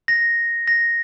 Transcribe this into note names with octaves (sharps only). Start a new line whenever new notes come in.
A#6
A#6